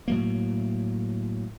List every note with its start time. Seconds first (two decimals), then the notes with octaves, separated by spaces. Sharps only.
0.08 A2 F#3 A#3